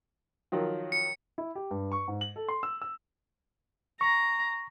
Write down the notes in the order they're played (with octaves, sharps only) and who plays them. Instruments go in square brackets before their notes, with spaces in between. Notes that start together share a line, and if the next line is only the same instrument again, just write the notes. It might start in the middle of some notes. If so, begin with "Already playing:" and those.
[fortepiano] D#3 F3 F#3
[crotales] C#7
[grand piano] E4
G4
G2
C#6
G#2
F#7
A4
C6
E6
E6
[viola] A#5 [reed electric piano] C#6